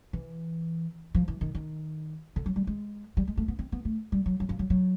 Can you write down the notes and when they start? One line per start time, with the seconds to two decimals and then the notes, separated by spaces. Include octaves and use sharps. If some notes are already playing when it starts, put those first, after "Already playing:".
0.13 E3
1.15 F3
1.28 E3
1.41 D#3
1.55 D#3
2.36 D3
2.46 F#3
2.56 G3
2.67 G#3
3.17 G3
3.27 G#3
3.37 A3
3.48 B3
3.59 C4
3.72 B3
3.85 A3
4.12 G3
4.26 F#3
4.40 F#3
4.49 F3
4.59 F#3
4.70 F#3